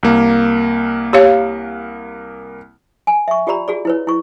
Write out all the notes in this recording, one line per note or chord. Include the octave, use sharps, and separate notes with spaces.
C2 A#3
G4 C#5 F5
G#5
E5 C#6
F4 G4 D5 A#5 B5
F#4 G#4 D5
E4 B4 C#5
E4 C#6